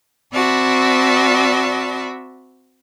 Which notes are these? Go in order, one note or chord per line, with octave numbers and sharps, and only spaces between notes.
C4 F#4 D5 E5 A5 B5